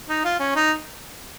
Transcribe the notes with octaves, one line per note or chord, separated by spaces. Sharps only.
D#4
F4
C#4
D#4